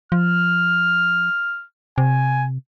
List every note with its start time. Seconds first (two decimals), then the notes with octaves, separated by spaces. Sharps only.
0.12 F3 F6
1.98 C3 G#5